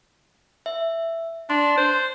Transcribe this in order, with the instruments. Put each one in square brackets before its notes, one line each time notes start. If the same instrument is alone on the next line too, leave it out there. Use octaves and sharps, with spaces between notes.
[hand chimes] E5
[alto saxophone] D4 [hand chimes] C6
[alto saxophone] C5